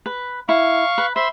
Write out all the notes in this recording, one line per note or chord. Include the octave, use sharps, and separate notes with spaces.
B4
E4 F5 C#6
B4
C5 E5 B5 C6